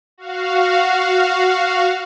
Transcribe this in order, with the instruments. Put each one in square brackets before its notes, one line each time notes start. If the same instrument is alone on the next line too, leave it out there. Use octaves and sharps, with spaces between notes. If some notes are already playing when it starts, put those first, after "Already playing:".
[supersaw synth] F#4 F5